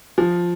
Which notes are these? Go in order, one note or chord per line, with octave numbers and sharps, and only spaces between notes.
F3